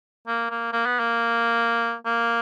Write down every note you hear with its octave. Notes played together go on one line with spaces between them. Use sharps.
A#3
A#3
A#3
B3
A#3
A#3